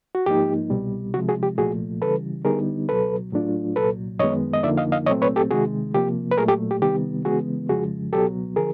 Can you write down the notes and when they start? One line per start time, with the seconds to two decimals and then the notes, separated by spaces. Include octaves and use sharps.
0.15 F#4
0.26 G#2 F3 A#3 D#4 G4
0.70 C2 B2 G3
1.14 C3 F3 G#3 F#4
1.29 F#4 G#4
1.43 G4
1.58 C2 A#2 F3 A3 F#4 G#4
2.01 C#3 E3 G3 A4 B4
2.45 D3 G3 B3 D#4 G#4 A#4
2.89 C#2 B2 F#3 A4 B4
3.32 A2 F#3 A3 D4 F4
3.76 C2 A#2 F#3 A4 B4
4.19 F#2 D#3 G#3 B3 C#5 D#5
4.53 D#5
4.63 F2 D3 F3 A#3 D#4 D5 E5
4.77 D#5 F5
4.92 D#5 F5
5.06 C2 A#2 F#3 A3 C4 C#5 D#5
5.22 B4 C#5
5.36 G4 A4
5.51 C3 D#3 G#3 F#4 G#4
5.94 C3 F3 A#3 G4
6.32 B4
6.38 A#2 F#3 A3 G#4 A#4
6.48 G4 A4
6.71 G4
6.82 C3 D#3 G3 B3 G4
7.25 C#3 E3 G#3 B3 F#4 G#4
7.69 F2 C#3 F3 G#3 F#4 G#4
8.12 C#2 B2 F#3 B3 G4 A4
8.56 D3 F3 G#4 A#4